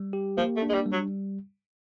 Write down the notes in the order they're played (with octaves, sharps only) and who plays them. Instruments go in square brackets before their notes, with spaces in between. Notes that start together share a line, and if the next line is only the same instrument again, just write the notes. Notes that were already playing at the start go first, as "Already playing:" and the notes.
Already playing: [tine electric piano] G3
G4
[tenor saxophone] F3 [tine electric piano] A#3
[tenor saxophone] A3
[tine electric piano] D4
[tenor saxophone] G#3
G3
[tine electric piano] G3
[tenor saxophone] F#3